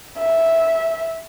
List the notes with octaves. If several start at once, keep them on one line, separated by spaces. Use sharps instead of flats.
E5